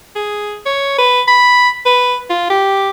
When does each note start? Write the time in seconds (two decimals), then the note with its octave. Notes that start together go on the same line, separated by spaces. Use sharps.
0.16 G#4
0.66 C#5
0.98 B4
1.28 B5
1.86 B4
2.30 F4
2.50 G4